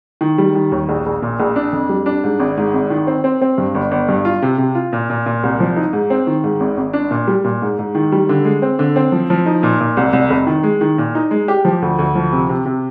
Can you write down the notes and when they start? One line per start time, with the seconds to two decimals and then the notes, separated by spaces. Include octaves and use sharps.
0.21 D#3
0.38 G3
0.55 D#3
0.72 D#2
0.89 A#1
1.06 A#1
1.22 A#2
1.40 A#1
1.56 D4
1.73 F2
1.89 G3
2.06 D4
2.24 G#2
2.39 G#1
2.57 G#2
2.74 G#1
2.90 D#3
3.07 C4
3.24 C4
3.42 C4
3.58 G2
3.75 G1
3.91 G1
4.09 G2
4.25 F4
4.42 C3
4.58 C3
4.75 F4
4.93 A#2
5.10 A#2
5.26 A#2
5.43 C2
5.60 F3
5.76 D#4
5.93 G#2
6.10 C4
6.27 D#3
6.44 G#2
6.60 G#1
6.77 G#1
6.93 D4
7.11 A#2
7.28 G3
7.44 A#2
7.62 G#2
7.79 G#2
7.95 D#3
8.12 G3
8.29 D3
8.45 G#3
8.62 C4
8.79 D3
8.96 C4
9.12 F3
9.30 F3
9.46 D#4
9.63 A#2
9.81 A#2
9.97 C2
10.13 C2
10.30 F1
10.47 D#3
10.63 G#3
10.81 D#3
10.98 A#2
11.15 D#4
11.31 G#3
11.48 G4
11.65 F3
11.82 D2
11.99 D2
12.15 F3
12.33 C3
12.49 C3
12.66 C3